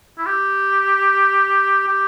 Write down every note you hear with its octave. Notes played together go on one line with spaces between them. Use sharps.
E4
G4
G4